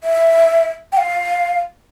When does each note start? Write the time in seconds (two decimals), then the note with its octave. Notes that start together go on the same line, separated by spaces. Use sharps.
0.04 E5
0.92 G5
0.97 F5